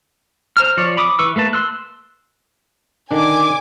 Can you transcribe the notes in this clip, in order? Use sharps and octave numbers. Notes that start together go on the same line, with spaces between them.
C5 A#5 F6
F3 C#5 D5
B5 D6 D#6
E3 B4 C#6 E6
A3 A#3 B4 A5
C6 E6 F#6
D3 D#3 D4 G#5 D6